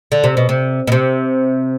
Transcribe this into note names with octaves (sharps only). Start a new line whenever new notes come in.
D3
C3
B2
C3
B2
C3